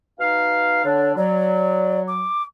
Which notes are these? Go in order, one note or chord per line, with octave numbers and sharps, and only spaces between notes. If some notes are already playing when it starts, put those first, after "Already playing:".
B2 D#4 F5
D3 D4 C#5
F#3 D5
D6